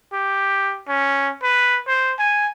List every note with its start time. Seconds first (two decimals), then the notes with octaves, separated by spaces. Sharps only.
0.13 G4
0.88 C#4
1.43 B4
1.87 C5
2.19 G#5